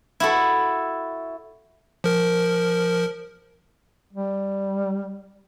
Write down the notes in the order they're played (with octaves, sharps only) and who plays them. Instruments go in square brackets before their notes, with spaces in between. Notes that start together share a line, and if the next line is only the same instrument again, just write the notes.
[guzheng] E4 F#4 A4
[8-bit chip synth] F3 A#4
[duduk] G3